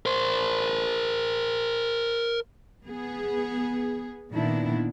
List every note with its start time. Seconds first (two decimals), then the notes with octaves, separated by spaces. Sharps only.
0.06 A#4 C5
2.85 B3 G#4
4.32 A#2 D#3 B3 D4 E4